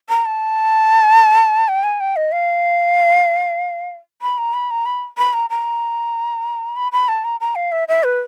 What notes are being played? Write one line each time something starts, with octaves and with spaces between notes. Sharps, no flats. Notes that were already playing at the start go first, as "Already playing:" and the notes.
A#5
A5
G5
G#5
G5
D#5
F5
B5
A#5
B5
A#5
B5
B5
A#5
A#5
B5
B5
A5
A#5
A#5
F5
E5
E5
B4